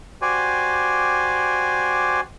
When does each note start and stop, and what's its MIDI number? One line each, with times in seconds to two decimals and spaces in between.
0.22 2.20 66
0.22 2.20 67
0.22 2.20 72
0.22 2.20 74
0.22 2.20 80